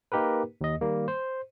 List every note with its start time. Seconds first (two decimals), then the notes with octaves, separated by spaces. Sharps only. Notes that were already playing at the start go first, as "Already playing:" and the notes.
0.12 A#3 D#4 G4 A#4 B4
0.61 D#2 D#5
0.81 D#3 G3 A#3
1.08 C5